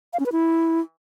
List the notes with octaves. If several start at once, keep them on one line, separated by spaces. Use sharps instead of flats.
F5
C#4
B4
E4